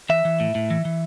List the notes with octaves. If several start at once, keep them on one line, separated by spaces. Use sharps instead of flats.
E3 E5
E3
A2
A2
E3
E3